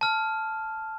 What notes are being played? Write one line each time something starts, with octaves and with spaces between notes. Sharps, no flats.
A5 F6